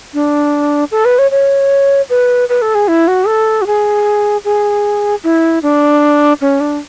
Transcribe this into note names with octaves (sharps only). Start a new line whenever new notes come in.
D4
A4
B4
C#5
C#5
B4
B4
A4
G#4
E4
F#4
A4
F#4
G#4
G#4
E4
D4
C#4
D4